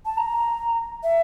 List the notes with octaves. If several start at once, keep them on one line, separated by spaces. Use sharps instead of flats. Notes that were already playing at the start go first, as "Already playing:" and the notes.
A5
A#5
E5